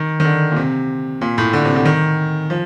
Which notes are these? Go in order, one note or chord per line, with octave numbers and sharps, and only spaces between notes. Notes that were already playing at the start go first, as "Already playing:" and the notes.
Already playing: D#3
D#3
D3
A#2
C3
A#2
A2
D3
C3
D3
D#3
F3